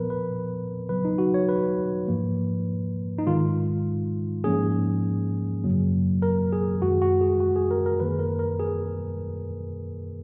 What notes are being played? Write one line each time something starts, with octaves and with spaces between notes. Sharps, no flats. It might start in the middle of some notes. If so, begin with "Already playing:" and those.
Already playing: A#2 F3 B3 A#4 B4
B4
C#3 F#3 B3 B4
D#4
F#4
C#5
B4
G#2 F3 A#3
D#4
G#2 D#3 G#3 F4
G#2 F3 A#3 C#4 G#4
F#2 C#3 F#3 A#3
A#4
G#4
F#2 D#3 G#3 F#4
F#4
G#4
F#4
G#4
A#4
A#4
F#2 D#3 A#3 B4
A#4
A#4
G#4